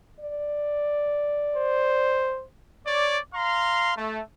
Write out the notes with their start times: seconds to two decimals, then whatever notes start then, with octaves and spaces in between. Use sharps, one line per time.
0.20 D5
1.56 C5
2.87 C#5 D5
3.35 F5 A#5 C6
3.97 A3